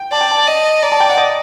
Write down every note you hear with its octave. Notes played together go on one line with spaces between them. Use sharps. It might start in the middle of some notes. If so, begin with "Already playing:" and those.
Already playing: G5
D5 A5
G5
A5
D#5
D5 A#5
A5
G5
F#5
D#5